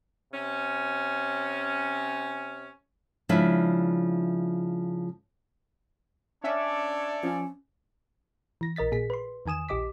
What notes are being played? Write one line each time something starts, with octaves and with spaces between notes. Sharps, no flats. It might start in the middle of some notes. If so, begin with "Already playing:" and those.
C3 C#4
C#3 F3 G#3 D4 E4 E5
C#4 D4 A4 C#5 D5 E5
F3 C#4
E3 A#6
A#1 A#4 D#5 A6 B6
A#2 G#4 B6
B4 C6
E2 D#3 G#5 D#6 E7
A#1 G4 D#5 D6 B6